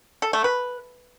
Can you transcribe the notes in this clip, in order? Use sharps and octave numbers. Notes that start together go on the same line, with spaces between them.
A4
A3
B4